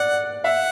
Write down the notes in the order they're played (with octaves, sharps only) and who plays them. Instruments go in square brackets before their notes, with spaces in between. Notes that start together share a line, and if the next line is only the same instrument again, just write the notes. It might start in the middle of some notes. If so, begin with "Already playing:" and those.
Already playing: [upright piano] D5 [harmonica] F#5
[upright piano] E5 [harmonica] F#5